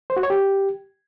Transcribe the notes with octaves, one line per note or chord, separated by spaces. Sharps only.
C5
F#4
C#5
G4